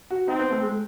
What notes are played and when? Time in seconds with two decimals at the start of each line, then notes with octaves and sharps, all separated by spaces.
0.10 F#4
0.28 C4 D#4
0.39 B3
0.51 A3
0.62 G#3